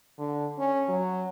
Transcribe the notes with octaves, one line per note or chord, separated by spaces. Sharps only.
D3
C#4
F#3